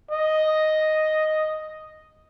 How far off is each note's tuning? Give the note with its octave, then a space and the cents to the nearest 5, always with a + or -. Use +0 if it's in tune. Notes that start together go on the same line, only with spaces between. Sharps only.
D#5 +0